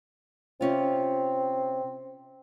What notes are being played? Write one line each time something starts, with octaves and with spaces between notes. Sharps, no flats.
C3 C4 C#4 F4